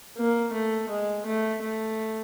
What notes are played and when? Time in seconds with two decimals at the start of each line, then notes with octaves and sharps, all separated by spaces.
0.17 A#3
0.53 A3
0.90 G#3
1.26 A3
1.62 A3